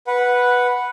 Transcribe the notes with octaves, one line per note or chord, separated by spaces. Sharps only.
B4 F#5